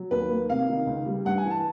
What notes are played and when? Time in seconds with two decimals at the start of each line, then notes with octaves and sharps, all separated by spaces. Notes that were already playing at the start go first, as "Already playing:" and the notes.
Already playing: F#3
0.11 D#2 B4
0.31 A#3
0.50 C3 F5
0.68 D#3
0.87 C#2
1.06 G3
1.25 G2 F#5
1.38 G#5
1.44 E3
1.51 A5